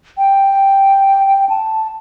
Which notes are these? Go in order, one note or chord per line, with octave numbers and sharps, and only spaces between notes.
G5
A5